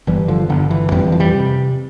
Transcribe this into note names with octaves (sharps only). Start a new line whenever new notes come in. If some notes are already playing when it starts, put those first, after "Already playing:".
G1 E3 G3
D3 F3
G1 D3
E3
F2 E3 G3
F3
E3 G3
C3